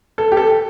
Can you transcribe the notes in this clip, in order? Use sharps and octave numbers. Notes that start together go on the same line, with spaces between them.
A4
G4
A4